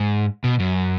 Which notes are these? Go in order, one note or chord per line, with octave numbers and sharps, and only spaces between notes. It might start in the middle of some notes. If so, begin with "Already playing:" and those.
Already playing: G#2
B2
F#2